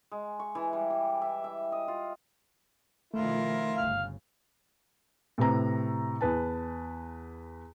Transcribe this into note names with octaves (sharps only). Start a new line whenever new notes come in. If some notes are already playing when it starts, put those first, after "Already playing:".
G#3
C#6
E3
G3
G4
E5
E5
D#5
F4
B2 D#3 F3 A3 E4 F4 A#4
G1 D2 C#3 F5
A2 C3 B4 A#5
E2 B4 A5